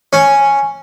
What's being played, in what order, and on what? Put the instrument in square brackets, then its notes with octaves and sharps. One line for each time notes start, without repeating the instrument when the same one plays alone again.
[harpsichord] C#4